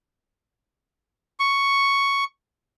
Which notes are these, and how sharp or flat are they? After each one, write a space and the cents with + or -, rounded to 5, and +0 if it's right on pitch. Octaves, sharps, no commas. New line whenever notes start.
C#6 +5